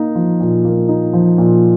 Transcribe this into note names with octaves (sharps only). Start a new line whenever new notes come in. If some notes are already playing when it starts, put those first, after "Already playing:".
Already playing: A#3 D#4
F3
A#2
A#3
D#4
F3
A#2